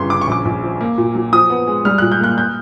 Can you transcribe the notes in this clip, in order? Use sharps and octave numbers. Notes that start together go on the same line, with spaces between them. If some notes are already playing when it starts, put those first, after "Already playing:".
Already playing: G1 C#3 C6
C#3 D6
C#6
A#1 D6
A#1
F3
A#3
A#2
F#3
F3 D#6
B3
G#3
G3 F6
A#2 F#6
G6
A#3 F#6
G6